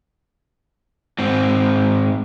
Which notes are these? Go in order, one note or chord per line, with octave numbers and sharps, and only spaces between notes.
G#2 C4